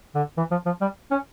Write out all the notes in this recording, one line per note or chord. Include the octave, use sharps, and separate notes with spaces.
D3
E3
F3
F3
G3
C#4